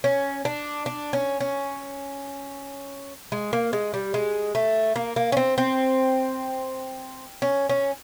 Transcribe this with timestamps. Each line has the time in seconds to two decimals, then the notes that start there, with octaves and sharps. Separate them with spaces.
0.04 C#4
0.45 D4
0.86 D4
1.13 C#4
1.40 C#4
3.32 G#3
3.53 A#3
3.73 G#3
3.94 G3
4.14 G#3
4.55 A3
4.96 A#3
5.16 A#3
5.32 C#4
5.37 C4
5.58 C4
7.42 C#4
7.69 C#4